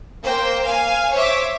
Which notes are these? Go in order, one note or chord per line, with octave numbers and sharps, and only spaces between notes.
A#3 C5 G5
F5 G#5
C5 C#5 E5 D6